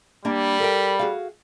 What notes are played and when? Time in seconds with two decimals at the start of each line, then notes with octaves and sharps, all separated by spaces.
0.25 G3 A#3 D4 B5
0.60 A4 A#4 G5
0.99 F#4 G#4 F5